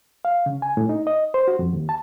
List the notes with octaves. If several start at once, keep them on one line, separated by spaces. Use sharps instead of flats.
F5
C#3
G#5
A2
D#4
D#5
C5
F#4
F2
D#2
A5